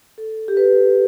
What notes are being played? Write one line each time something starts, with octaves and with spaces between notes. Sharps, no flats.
A4
G4
B4